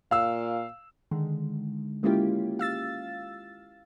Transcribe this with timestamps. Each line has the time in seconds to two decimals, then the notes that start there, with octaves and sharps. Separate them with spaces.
0.11 A#2 F5 E6
1.11 D3 D#3 G#3
2.03 G#3 A#3 C#4 E4 F4 G4
2.59 F5 E6 A6